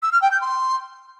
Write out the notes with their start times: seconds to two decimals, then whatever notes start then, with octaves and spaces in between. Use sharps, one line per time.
0.02 E6
0.12 F6
0.22 G5
0.31 G6
0.41 C6